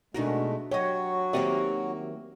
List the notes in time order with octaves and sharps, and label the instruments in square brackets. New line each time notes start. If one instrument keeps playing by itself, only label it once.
[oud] B2 D#4 A#4 [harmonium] G#3 A3 [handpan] D4 F#4
[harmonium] F#3 F#4 [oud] G4 D#5 [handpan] C#5
[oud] D#3 A#3 D5 [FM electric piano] C4 G4 E5